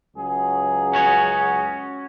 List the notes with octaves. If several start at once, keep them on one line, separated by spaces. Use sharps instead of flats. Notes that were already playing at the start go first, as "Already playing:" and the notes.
C#2 F#3 G#4
C#4 F#4 C#5